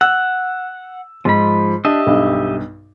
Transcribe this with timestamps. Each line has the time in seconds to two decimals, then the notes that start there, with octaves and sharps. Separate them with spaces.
0.01 F#5 E6
1.25 G#2 F3 B5
1.85 D4 G4 D#5 E5
2.06 B1 G2